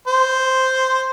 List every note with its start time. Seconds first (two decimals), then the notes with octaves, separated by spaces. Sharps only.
0.07 C5